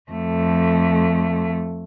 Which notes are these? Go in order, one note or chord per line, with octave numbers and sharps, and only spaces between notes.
F2 A3